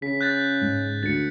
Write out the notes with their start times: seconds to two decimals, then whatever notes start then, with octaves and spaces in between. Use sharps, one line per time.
0.02 C#3 B6
0.21 F#6 G6 A6
0.61 G#2
1.03 D2 A6 C#7